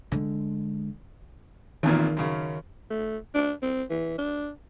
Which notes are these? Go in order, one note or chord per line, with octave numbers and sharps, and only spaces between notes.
D3 G#3
G#1 E2 A#2 D#3
F#2 C#3
A3
D4
C4
E3
D4